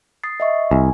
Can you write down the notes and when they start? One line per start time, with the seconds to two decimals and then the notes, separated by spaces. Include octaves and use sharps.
0.23 D#6 A6 C7
0.40 D#5 E5 C#6
0.71 C2 G#5